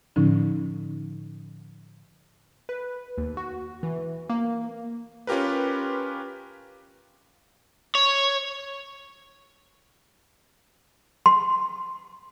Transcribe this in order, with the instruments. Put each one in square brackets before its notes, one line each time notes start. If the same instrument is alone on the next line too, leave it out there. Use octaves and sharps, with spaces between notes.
[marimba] A2 D3 F3 C#4 D#4
[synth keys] B4
D#2
F#4
E3
A#3
[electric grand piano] C#4 F4 G4 A#4 B4
[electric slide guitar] C#5
[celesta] C6